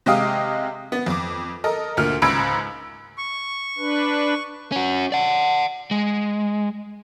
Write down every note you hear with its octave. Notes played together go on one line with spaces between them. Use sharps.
C3 G#3 G4 D#5 F5 D#6
B3
F2 D6
A4 A#4 D#5
D2 A#2 F6
C#2 G#2 B5 E6 G#6 D7
C#6
D4 B4
C#4 F#4
D5 F#5
G#3